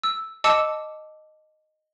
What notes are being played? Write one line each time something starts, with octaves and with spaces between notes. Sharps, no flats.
E6
D#5 A5 D6 E6 C#7 E7